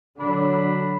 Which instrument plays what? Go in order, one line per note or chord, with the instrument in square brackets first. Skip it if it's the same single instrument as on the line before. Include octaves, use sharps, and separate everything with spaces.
[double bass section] D3 F#3 [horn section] D4 B5